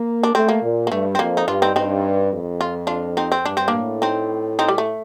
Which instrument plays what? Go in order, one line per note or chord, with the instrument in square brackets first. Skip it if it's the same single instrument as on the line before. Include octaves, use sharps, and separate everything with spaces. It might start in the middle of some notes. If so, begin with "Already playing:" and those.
Already playing: [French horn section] A#3
[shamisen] D4
[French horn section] A3 [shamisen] C4
[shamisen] A#3
[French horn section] A#2
[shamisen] A#3
[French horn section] G2 [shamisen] A3
[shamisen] C4
[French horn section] F2 [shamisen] A#3
[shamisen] D#4
[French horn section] G2 [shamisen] D4 F4
[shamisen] C4 D#4
[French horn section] G2 [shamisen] C4 D#4
[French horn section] F2
[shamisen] F4
D4 F4
C4 D#4
C4
[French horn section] G2 [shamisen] D4
[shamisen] C4
A#3 D4
[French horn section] A2
[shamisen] C4 D#4
C4 D#4
G3
A3